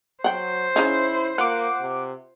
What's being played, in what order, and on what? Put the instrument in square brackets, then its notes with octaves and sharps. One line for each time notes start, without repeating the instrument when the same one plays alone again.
[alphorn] F#3 [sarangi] C5 [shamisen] F#5 G5
[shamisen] C#3 C#4 D#4 [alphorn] E4
[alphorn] A#3 [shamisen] F4 [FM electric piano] F#5 D6
[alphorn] C3